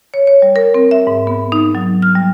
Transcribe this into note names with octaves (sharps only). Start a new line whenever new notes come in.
C#5
C#5
G3
A#4
C4
E5
G#2
B3
D#4
F#3
F6
G3